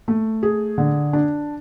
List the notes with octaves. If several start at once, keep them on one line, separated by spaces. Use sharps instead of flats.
A3
G#4
D3
D4